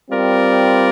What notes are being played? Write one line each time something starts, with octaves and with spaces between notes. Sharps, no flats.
G3 C4 F4 A#4 D5